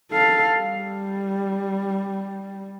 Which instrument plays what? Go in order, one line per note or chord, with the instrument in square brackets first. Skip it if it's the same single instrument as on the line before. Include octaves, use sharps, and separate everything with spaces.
[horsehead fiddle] A4 F5
G3